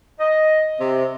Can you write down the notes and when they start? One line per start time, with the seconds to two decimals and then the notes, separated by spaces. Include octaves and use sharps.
0.20 D#5
0.79 C3